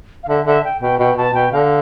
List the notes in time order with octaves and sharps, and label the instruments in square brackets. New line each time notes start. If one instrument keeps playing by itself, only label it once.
[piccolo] F5
[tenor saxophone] D3 [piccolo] E5
[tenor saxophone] D3 [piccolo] E5
[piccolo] G5
[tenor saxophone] B2 [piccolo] G5
[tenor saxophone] B2 [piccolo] G5
[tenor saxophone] B2 [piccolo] A5
[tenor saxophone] B2 [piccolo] G5
[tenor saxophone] D3 [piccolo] F5